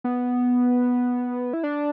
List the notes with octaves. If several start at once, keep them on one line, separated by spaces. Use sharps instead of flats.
B3
E4
D4